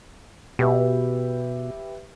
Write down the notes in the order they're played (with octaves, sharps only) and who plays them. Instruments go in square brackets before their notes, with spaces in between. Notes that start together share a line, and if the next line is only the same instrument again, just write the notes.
[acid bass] B2 [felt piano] G4 B4 E5